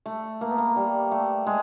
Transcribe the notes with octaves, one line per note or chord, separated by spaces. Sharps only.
A3
A#3
B3
A#3
G3
A3
G#3